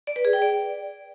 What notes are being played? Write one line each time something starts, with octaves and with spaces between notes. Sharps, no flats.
D5
B4
G#4
G5
D5